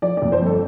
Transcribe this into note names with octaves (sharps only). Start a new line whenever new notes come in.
F3 D5
F2 D5
C5
G1 A4